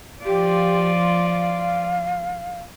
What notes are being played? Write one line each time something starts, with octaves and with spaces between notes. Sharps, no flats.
F3 F4 G4 D5
F5